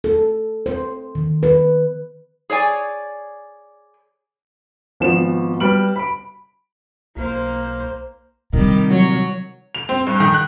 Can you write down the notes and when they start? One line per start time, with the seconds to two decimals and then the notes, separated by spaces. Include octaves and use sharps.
0.04 A4
0.66 C5
1.15 D#3
1.43 B4
2.50 G#4 C#5 D5 G#5
5.00 G#1 F3 B3 E7
5.60 G3 B4 F6 D7 F#7
5.96 B5 D7
7.16 B1 A#3 C5
8.53 C3 D#3 G3
8.88 F#3 C#5
9.75 F7
9.89 C4
10.07 G2
10.20 D#3
10.34 F#6